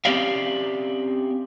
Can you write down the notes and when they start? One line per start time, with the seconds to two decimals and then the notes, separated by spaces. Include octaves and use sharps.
0.05 C4 C#4 G4 D5 E5 F5